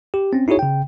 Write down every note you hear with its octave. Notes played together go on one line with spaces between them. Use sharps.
G4
C4 C#4
D#4 E4 F#4 G#4 C#5
C#3 G5